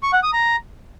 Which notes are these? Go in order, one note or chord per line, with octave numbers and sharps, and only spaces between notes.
C#6
F#5
D#6
A#5